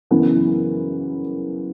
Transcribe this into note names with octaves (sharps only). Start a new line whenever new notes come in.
F#2 C#3 E3 B3